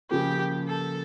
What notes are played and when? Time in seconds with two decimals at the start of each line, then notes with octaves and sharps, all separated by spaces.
0.11 C#3 F3 A#3 G4
0.68 A4